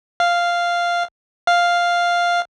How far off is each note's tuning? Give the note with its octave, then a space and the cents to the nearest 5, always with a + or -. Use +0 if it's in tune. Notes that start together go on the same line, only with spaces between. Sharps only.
F5 -5
F5 +0